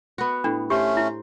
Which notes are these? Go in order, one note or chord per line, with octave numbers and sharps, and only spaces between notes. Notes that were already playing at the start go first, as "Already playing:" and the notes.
B3 F#4
A2 D4
A3 C#4 G4 C5
E4